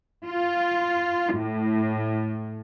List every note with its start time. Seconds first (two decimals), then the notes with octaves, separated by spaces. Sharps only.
0.24 F4
1.33 A2